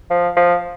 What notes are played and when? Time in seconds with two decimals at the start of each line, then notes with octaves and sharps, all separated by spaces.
0.10 F3
0.37 F3